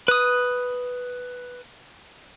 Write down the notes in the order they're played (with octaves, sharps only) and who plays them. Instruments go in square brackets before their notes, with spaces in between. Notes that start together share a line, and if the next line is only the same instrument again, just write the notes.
[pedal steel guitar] B4 D#6